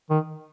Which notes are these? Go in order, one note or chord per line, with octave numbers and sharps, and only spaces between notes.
D#3